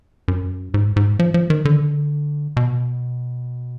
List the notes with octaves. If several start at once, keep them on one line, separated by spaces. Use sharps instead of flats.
F#2
G#2
G#2
F3
F3
D#3
D3
B2